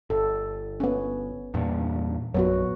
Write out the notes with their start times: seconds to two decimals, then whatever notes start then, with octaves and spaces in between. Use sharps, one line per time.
0.10 G1 A4
0.80 B3 C#4
1.54 E2 G2 A#2
2.34 A#1 F#2 F#3 B3 F#4